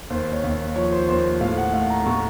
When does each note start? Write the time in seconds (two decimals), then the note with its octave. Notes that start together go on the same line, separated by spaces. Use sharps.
0.10 D#2 C5
0.33 C#5
0.44 D#2
0.76 F3 C#5
0.92 C5
1.08 D#2 C5
1.41 A2 F5
1.57 F#5
1.73 A3 F5
1.90 A#5
2.06 A2 C#6